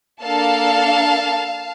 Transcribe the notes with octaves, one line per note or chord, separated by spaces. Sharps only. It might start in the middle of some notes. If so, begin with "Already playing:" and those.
A#3 D4 A4 F5 A5